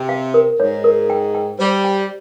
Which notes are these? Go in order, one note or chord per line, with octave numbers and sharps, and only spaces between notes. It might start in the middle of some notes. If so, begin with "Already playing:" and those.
Already playing: C3
F5
A#4
G#2 C#5
A#4
G5
G5
G3 C5
G5